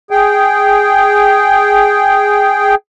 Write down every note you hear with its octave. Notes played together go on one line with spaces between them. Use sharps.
G#4 G5